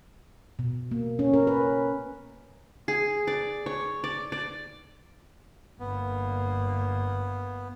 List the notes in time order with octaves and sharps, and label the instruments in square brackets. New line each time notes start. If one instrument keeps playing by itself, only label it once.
[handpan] B2
A#3
C#4
A#4
B4
[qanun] G#4
D5
C#5
D5
D5
[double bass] G1 A#3 [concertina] B3